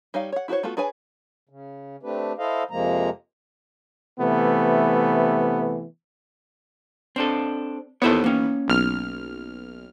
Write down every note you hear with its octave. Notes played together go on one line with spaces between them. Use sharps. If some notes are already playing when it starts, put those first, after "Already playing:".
G3 D#4 C#5 F5 G5
C#5 F#5
E4 F#4 A4 C5 C#5
A3 B3 F4 F#4 A4
D4 G#4 B4 C#5 G#5
C#3
A3 C4 D4 G4 B4
E4 A4 C5 D#5 F5
F2 C3 F3 G#3 A#3 A#5
C3 E3 A3 B3
C4 D4 A4
D#2 E3 B3 A4 C5 C#5
A#3 C#4
B1 F6